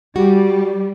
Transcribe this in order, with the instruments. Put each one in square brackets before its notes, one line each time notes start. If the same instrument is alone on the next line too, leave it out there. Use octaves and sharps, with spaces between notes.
[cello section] G3 [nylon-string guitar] F#4 [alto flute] G4